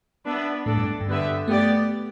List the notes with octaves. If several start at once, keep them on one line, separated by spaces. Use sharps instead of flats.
B3 D4 B4 E5
A2 D4 A4 D5
G2
G2
D3 B3 G4 B4 E5
A3 B3 G4 D5